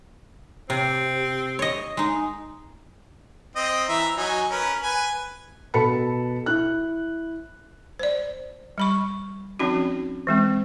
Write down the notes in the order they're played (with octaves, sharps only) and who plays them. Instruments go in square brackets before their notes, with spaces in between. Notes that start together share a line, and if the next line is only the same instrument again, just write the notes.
[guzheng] C3 [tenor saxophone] C4
[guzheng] C#5 D#5
G#3 D#4
[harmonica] C4 D#5
E3 E5 A#5
F#3 D#4 G#5
C#4 A#4 B4
B4 G#5
[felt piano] B2 A4 A5 B5 C#7
E4 F#6
[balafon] C5 D5
G3 B5 C#6
F3 C4 C#4 D#4 F#4
E3 G#3 C4